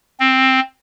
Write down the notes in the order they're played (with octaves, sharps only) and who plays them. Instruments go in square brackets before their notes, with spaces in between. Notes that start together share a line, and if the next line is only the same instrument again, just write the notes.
[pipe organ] C4